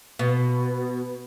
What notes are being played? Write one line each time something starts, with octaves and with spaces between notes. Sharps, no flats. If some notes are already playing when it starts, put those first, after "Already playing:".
B2